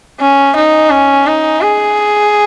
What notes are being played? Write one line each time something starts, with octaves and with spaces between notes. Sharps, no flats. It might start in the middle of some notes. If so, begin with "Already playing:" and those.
C#4
D#4
C#4
D#4
G#4